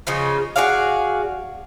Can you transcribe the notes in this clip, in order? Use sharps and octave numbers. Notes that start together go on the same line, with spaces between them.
C#3 F3 D#4
F#4 G#4 D5 F5